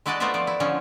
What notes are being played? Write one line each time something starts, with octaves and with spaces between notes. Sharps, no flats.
G#3 E4 F#4 D5 D#5 A5
A3 B3 F4 C5 D5 E5
F3 D5
E4
D3 F3 C#4 D#4